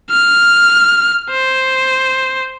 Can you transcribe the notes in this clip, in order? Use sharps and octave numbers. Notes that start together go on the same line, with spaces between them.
F6
C5